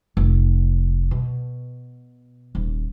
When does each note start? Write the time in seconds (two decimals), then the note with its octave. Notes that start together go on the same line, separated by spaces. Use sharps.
0.17 F1
1.11 B2
2.55 D#1